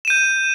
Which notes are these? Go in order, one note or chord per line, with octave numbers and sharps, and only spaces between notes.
G6 D#7 E7